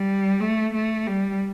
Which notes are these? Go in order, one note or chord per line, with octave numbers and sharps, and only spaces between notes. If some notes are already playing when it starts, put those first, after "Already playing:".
Already playing: G3
A3
A3
G3